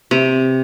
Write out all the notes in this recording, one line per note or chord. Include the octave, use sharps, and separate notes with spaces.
C3